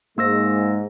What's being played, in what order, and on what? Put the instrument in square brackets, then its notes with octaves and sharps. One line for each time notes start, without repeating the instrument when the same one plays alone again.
[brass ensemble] G#2 G#3 [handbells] A#3 E6 A#6